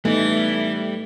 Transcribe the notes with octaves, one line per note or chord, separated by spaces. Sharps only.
E3 G3 A3 B3 D#4